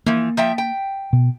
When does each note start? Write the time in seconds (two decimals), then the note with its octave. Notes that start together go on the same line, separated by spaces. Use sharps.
0.06 E3 F3 A#3
0.37 F3 E5 G5
0.58 G5
1.13 B2